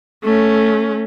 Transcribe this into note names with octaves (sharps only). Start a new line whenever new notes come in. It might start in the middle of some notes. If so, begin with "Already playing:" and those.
A3 C#4